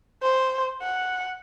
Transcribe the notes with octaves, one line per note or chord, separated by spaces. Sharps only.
C5
F#5